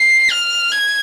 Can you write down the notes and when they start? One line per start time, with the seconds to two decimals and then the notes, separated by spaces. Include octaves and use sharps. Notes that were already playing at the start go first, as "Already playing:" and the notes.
Already playing: C7
0.31 F6
0.72 G#6